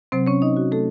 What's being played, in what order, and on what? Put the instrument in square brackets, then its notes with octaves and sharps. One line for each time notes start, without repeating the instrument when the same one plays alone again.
[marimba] C3 F#3 C4 C5
C#4 C#5
D#4 D#5
F#4
A3 A4